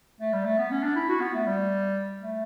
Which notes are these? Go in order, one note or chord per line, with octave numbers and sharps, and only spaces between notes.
A3
G3
A3
B3
C#4
D4
E4
F#4
B3
A3
G3
A3